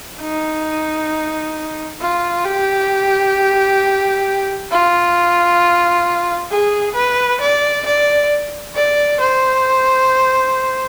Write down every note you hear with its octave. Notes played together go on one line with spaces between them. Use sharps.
D#4
F4
G4
F4
G#4
B4
D5
D5
D5
C5